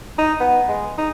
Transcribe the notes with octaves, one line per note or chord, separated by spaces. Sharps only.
D#4
B3
G#3
D#4